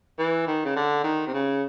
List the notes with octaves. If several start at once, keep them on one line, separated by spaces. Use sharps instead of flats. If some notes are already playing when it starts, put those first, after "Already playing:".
E3
D#3
C#3
D3
D#3
C3
C#3